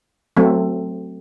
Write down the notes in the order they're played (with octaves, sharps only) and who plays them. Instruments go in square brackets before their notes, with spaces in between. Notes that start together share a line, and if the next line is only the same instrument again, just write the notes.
[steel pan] F#3 A3 C4